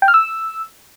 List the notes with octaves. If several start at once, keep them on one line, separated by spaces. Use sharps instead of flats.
G5
F6
E6